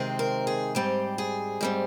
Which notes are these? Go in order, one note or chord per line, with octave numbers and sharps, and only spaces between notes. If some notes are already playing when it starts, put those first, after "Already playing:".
Already playing: C3 D#3 G#3 C4
A#4
G#4
G#2 G3 C4 G4
G#4
G#2 G3 C4